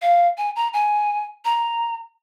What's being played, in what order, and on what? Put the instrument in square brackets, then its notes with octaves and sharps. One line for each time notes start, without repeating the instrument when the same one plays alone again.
[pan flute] F5
G#5
A#5
G#5
A#5